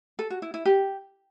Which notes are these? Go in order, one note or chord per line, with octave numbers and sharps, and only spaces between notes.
A4
F#4
E4
E4
G4